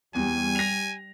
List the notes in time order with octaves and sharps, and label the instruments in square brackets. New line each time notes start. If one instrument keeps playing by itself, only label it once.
[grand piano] E2 [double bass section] G3 [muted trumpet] G#5
[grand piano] A#6 F7